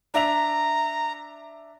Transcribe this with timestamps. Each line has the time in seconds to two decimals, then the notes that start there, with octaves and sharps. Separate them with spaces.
0.14 D4 E5 A#5 F7